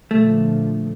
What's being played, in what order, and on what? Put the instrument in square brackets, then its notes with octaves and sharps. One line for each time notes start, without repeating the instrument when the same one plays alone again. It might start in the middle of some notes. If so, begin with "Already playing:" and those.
[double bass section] A#2 D3 F3 [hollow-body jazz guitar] A3